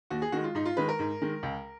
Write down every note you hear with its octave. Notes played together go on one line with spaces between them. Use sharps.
D#2 F#4
G#4
D#3 G#3 F#4
F4
G#2 D#4
F4
D#3 G#3 B4
A#4
G#2
D#3 G#3
C#2